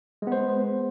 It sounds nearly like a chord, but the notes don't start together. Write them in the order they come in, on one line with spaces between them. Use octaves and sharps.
G#3 B3 C5